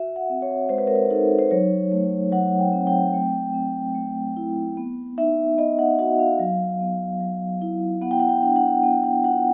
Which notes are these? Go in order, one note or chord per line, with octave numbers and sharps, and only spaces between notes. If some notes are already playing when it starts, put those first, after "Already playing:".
Already playing: F#4 E5
F#5
C4
C#5
G#3 C5
B4
A#4
B4
D#4 A4
C5
F#3 C#5
A3
F#3 F#5
G5
C4
G5
A3
C4
A3
E4
B3
D#4 E5
B3 D#5
F#5
F#4 F#5
F5
F#3
B3
F#3
E4
B3 F#5
G5
F#5
G5
D4
F#5
B3 G5
F#5
F4 F#5